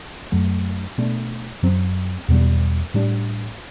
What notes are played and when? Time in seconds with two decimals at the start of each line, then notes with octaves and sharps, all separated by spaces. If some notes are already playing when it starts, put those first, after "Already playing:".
0.32 F#2 F#3 A3
0.98 B2 A3 D4
1.63 F#2 F#3 C4
2.28 E2 B2 G3
2.94 A2 G3 D4